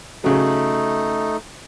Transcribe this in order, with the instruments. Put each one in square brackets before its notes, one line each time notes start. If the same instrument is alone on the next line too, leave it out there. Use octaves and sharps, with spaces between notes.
[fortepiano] C#3 F#3 [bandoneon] A3 D#4